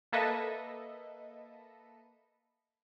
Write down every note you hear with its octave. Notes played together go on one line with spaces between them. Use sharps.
A#3 A4 B4 D#5 E5